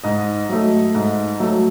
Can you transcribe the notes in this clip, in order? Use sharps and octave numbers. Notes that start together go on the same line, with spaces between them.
G#2 D#5
F#3 A3
G#2
F#3 A3